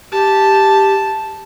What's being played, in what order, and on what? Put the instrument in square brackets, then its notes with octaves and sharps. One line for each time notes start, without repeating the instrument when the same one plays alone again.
[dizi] G4 [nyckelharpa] A5